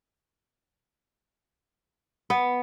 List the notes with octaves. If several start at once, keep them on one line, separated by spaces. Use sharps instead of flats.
B3